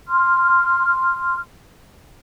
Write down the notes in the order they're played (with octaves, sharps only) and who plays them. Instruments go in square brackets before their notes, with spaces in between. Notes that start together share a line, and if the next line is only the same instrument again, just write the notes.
[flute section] C6 F6